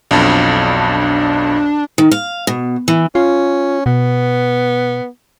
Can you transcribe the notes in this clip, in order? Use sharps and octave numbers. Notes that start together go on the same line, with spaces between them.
B1 F2 D4
D#3
F5
B2
E3
C#4 F4
B2 B3